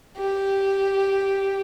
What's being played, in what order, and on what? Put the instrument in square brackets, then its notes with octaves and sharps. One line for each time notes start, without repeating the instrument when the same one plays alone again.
[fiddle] G4